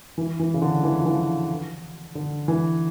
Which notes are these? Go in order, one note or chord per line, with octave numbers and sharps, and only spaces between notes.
E3
E3
C#3
D3
E3
F3
E3
D3
E3